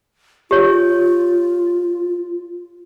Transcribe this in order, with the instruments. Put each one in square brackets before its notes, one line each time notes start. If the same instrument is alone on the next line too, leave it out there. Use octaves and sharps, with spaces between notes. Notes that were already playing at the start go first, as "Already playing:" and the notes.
[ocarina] F4 [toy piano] G4 C#5